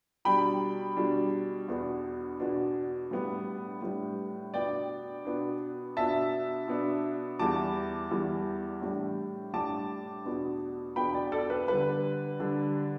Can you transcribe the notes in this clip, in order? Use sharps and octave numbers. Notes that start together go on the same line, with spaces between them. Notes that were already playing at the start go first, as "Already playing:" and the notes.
B2 G3 D4 G5 B5
B2 G3 D4
E2 B2 B3 D4
E2 B2 B3 D4
A2 G3 B3 D4
A2 G3 B3 D4
B2 B3 D4 D5 G5
B2 B3 D4
B2 B3 D4 E5 A5
B2 B3 D4
E2 E3 G3 A5 D6
E2 E3 G3
A2 G3 D4
A2 G3 D4 A5 D6
E2 B2 B3 D4
E2 B2 B3 D4 G5 B5
D5 G5
A4 D5
B4
D3 G3 D4 B4
D3 G3 D4